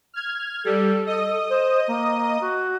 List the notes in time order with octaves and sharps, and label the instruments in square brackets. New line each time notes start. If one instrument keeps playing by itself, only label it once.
[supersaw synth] F6 G#6
[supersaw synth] G3 [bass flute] A4
[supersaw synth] D#5 D#6
[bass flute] C5
A#3
F#4